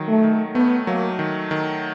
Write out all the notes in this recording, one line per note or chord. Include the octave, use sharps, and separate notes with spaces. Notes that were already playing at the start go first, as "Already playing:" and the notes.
Already playing: D#3 F#3
A3
D#3
A3 B3
F#3 A#3
D#3
D#3